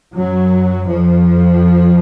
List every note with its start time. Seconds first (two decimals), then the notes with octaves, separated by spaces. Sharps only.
0.15 F#2 F#3
0.88 F2 F3